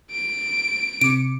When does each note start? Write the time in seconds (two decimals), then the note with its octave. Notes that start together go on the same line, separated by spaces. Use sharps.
0.12 D7
1.01 C3 D6 C#7 D7